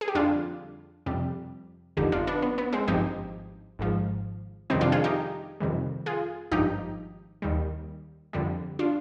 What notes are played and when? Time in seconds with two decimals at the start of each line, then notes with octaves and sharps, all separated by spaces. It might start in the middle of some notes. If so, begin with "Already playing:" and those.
0.01 G#4
0.08 G4
0.15 F2 D3 G3 D4 F4
1.06 F2 C3 G3
1.97 G1 F2 D3 D#4 G4
2.12 D4 F4
2.27 B3 D4
2.42 B3
2.58 B3
2.73 G#3 C4
2.88 G#1 G2 F3 D#4 G4
3.79 G#1 G#2 F3
4.70 F2 C3 D#3 G3 C4 D#4
4.81 D4 F4
4.92 F4 G#4
5.04 D#4 G4
5.60 F2 C3 D#3 G3
6.06 F4 G#4
6.52 G#1 G2 F3 D#4 G4
7.42 D#2 D#3 G3
8.33 F2 D3 G3
8.79 D4 F4